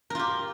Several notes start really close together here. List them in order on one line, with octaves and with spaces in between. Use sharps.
A#4 F4 G4